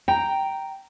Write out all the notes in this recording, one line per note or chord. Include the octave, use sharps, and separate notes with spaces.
G5 A#5